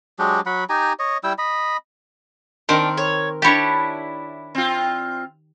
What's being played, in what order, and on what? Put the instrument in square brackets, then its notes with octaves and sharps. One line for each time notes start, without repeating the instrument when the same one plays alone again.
[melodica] F#3 G#3 D4 G4
F#3 F#5 B5
D#4 G4 G#5 A#5
C#5 D#5
G3 E4 G5 E6
D#5 B5
[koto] D#3 C4 [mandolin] D4 [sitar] A#4
[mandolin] C#5
[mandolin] D4 E4 A5 [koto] G4 C#5
[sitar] C4 F4